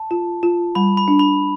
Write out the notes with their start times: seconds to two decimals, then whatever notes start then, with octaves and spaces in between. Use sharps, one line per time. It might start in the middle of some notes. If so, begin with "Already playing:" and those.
Already playing: A5
0.11 F4
0.43 F4
0.75 G3 B5
0.97 B5
1.08 D4
1.19 B5